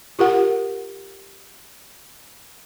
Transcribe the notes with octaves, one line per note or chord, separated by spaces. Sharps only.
F4 G4 A#4 F#5